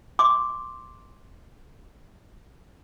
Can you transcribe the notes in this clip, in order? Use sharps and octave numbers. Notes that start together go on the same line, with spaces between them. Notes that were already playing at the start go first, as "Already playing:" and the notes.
C6 D6